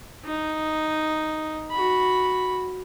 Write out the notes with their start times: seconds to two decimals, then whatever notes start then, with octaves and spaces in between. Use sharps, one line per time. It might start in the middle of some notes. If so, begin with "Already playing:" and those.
0.25 D#4
1.71 F#4 B5